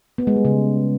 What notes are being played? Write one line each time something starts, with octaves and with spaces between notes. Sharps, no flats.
B3
G#3
G3
C#3